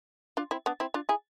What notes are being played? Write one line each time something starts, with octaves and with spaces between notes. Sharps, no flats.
D4 F4
C4 E4
B3 D4
C4 E4
D4 F4
E4 G#4